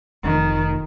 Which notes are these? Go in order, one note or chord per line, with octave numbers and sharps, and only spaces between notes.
F1 D#3